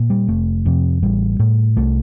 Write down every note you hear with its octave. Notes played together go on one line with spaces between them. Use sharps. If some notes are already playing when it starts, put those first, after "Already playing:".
Already playing: A#2
G3
F1 A3
F2 C3
A1 G3
A2
C2 A3